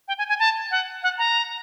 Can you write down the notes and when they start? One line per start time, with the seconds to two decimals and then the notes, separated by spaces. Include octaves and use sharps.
0.08 G5
0.18 G#5
0.29 G#5
0.39 A5
0.71 F#5
1.03 F#5
1.18 A#5